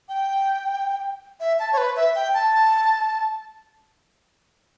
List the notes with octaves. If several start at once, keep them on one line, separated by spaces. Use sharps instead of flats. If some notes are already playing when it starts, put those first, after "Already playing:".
G5
E5
A5
C#5
B4
E5
G5
A5